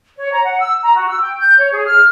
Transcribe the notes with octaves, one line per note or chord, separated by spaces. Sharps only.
C#5
A#5
F#5
E6
A#5
F#4
E6
G5
G6
C#5
G#4
F6